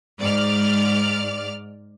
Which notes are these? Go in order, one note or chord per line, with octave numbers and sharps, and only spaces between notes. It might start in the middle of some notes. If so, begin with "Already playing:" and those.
G#2 D5 F6